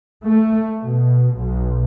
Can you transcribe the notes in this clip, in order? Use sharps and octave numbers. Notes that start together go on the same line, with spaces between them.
A3
B2
B1